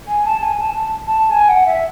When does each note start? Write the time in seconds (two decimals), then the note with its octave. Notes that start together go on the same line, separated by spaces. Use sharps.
0.08 G#5
0.25 A5
0.42 G#5
0.60 A5
1.07 A5
1.31 G#5
1.49 F#5
1.66 E5